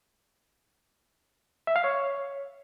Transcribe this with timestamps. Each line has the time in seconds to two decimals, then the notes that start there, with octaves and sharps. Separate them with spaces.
1.67 E5
1.76 F5
1.84 C#5